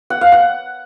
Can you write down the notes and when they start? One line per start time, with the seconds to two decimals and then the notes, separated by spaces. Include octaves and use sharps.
0.10 F#5
0.21 F5
0.32 F#5